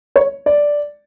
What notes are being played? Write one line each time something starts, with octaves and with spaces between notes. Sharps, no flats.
C#5
D5